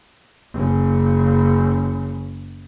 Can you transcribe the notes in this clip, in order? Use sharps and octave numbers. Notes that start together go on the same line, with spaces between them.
F#1 C#3